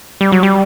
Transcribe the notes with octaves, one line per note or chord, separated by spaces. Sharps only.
G3
F#3
G3